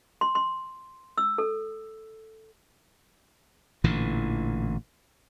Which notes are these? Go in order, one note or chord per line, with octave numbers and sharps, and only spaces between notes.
C6
C6
E6
A4
A1 A#2 D3 E3